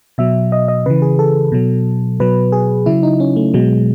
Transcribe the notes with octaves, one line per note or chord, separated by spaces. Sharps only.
B2 F#3 E5
D#5
D#5
C#3 E3 B4
G#4
A4
B2 F#3
B2 F#3 B4
G#4
C#3 F#3 E4
D#4
C#4
A3
B2 F#3 G#3